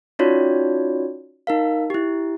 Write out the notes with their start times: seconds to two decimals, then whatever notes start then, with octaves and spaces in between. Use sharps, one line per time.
0.19 C#4 D#4 F4 F#4 C#5 D5
1.47 D#4 A#4 F5
1.90 E4 G4